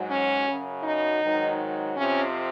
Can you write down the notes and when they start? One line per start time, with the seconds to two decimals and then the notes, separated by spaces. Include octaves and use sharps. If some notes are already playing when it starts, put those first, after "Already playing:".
Already playing: G#2 F#3
0.11 C#4
0.47 F#2 C#3 F#3
0.84 D#4
1.22 G#2 D#3 F#3
1.96 F2 C3 F3 C#4